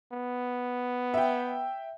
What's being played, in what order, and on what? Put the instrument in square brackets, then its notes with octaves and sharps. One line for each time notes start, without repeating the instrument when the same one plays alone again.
[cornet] B3
[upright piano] E5 G5